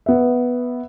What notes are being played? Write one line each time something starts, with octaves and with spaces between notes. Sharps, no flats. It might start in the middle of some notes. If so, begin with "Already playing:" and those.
B3 E5